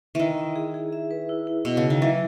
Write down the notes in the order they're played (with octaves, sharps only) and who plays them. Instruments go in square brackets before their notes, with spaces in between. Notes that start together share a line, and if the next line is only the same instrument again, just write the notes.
[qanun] D#3 E3 [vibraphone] E4
[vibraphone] E5
G#4
G#4
E5
B4
E4
E4
[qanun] B2 [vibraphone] E4
[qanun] C#3
[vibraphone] E4
[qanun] D#3
[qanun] E3 [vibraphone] F#3